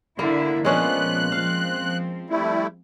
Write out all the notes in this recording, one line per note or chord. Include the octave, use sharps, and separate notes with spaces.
D3 A#3 E4
A#2 F3 G#3 B3 C#4 D4 F#6
F3 C4 F5
G3 A3 E4